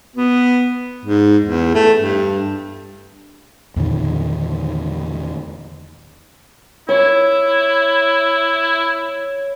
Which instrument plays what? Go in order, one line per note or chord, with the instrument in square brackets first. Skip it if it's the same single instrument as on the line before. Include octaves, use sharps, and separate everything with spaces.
[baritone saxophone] B3
G#2
E2
A3
G2
[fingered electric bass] E2 A#2 D3 D#3
[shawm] E4 [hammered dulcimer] C#5